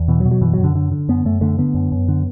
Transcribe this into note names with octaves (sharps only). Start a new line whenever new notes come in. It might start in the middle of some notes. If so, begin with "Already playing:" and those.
Already playing: E2
B2 E3
F#3
B2
F#3
F#2 E3
F#2 F#3
D3
D3
D3
F#2 B3
F#2 A3
D3 A3
D3 B3
F#2
F#2
D3